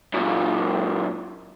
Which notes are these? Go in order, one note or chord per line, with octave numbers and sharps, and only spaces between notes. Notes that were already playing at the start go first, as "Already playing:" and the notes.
F#2 A#2